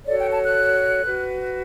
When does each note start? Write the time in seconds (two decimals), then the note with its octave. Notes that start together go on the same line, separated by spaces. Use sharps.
0.06 F#4 A4 C#5 D5
0.19 G5
0.31 A5
0.44 F#6
1.06 F#4 B4